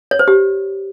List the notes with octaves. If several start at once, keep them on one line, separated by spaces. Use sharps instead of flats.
C#5
C5
G4